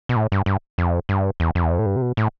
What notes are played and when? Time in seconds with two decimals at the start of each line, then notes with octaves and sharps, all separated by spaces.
0.09 B2
0.16 A2
0.32 G2
0.46 G2
0.78 F2
1.09 G2
1.40 E2
1.55 F2
1.63 E2
1.71 F2
1.79 A2
1.86 G2
1.96 C3
2.02 B2
2.17 A2